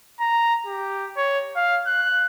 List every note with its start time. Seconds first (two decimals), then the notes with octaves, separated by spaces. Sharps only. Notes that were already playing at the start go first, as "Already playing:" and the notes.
0.20 A#5
0.66 G4
1.17 C#5
1.56 F5
1.87 F#6